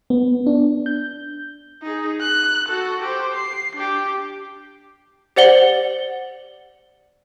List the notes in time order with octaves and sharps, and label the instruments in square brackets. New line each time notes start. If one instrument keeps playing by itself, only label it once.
[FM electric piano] B3
D4
G6
[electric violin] D#4 G#4
F#6
F#4 A4
G4 C5
C7
D4 G4
[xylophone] G4 C5 D5 F#5 F#7 G7